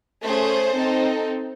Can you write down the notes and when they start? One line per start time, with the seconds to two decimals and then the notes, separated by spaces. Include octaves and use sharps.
0.24 A3 C#4 G#4 C5
0.76 C4 D#4 A4